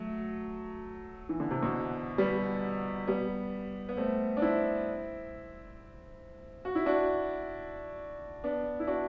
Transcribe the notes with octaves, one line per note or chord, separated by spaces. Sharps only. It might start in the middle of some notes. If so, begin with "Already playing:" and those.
Already playing: F#3 A3
E3
D3
C3
B2 D3
G3 B3
G3 B3
B3
A3 C4
D4
C4 E4
F#4
E4
D4 F#4
B3 D4
E4
D4 F#4